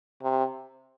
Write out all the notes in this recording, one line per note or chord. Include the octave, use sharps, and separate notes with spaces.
C3